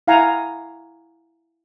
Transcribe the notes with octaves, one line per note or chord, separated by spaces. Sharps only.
E4 F5 F#5 G#5 A#5